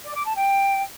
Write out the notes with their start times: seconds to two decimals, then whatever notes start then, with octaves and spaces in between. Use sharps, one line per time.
0.04 D5
0.15 D6
0.25 A5
0.35 G5